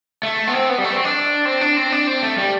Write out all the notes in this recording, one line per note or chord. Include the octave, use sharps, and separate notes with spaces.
A3
B3
C4
B3
G3
A3
C4
D4
C4
D4
C4
D4
C4
A3
G3